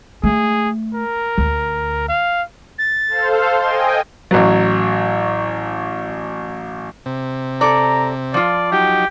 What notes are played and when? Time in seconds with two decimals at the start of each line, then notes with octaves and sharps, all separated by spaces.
0.23 A3 G#4
0.95 A#4
1.38 D2
2.08 F5
2.78 A6
3.07 A4 C5 F5
3.60 D#5 G5 G#5 C6
4.31 A1 F#3
7.06 C3
7.61 A4 D5 A#5
8.34 F3 F4 D5
8.72 F#3 D#4 G4